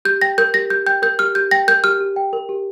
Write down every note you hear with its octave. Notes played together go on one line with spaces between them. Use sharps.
G4 G6
G5 A#6
A#4 G6
G4 A#6
G4 G6
G5 G6
A#4 G6
G4 F6
G4 G6
G5 A#6
A#4 G6
G4 F6
G4
G5
A#4
G4